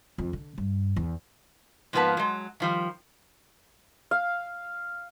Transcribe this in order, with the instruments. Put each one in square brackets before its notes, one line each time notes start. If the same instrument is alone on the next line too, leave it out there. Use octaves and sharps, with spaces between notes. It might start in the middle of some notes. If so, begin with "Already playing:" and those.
[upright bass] F2
D3
G2
E2
[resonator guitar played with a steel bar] G#2 F3 A#3 B3 B4 A5
F#3 G#3
D#3 F3 G3
[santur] F5